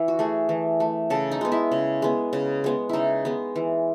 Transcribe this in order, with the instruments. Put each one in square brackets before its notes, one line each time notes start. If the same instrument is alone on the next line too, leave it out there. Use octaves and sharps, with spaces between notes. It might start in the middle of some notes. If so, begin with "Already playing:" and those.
Already playing: [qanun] E3 E4
F#4
A3 G#4
E3
A3
C#3 A4
D#4
G#3 B3
E4
C#3
G#3 B3
C#3
G#3 B3
C#3 D#4 E4
G#3 B3
E3